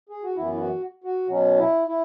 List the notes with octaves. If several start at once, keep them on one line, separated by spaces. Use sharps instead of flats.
G#4
F#4
F#2 E3 B3 E4
E4
F#4
F#4
B2 F#3 C#4
E4
E4